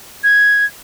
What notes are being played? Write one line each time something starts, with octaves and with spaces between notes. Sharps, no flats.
G#6